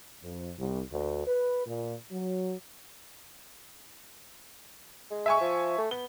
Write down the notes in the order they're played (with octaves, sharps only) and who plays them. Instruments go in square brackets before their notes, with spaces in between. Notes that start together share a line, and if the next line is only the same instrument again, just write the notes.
[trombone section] F2
C2
D2
B4
A#2
F#3
[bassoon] G#3
[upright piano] E5 G#5 C#6
[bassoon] F3
A3
[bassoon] B3 [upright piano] G7